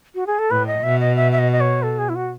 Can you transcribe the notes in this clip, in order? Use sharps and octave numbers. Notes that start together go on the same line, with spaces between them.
F#4
G#4
A4
A2 B4
D#5
B2 E5
D#5
E5
E5
D#5
D#5
C#5
A4
G#4
E4
F#4